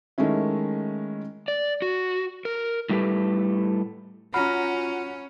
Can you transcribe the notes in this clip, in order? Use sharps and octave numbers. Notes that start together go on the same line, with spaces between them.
D#3 G#3 A3 C#4 E4
D5
F#4
A#4
A2 G3 A3 G4 B4
C#4 F4 F#4 A#5 B5 F6